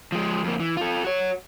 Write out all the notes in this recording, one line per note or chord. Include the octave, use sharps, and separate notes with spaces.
F3 G#3
F2 A#3
E3
F4 A4
F#4 C#5